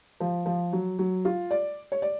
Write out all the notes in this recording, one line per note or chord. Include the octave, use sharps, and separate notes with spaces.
F3
F3
F#3
F#3
F4
D5
C#5
D5